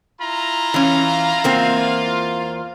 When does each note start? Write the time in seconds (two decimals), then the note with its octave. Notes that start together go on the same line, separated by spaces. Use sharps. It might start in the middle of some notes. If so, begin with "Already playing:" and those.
0.21 E4 F4 A#5
0.74 E3 C#4 F5
1.44 E2 A#3 C4 F4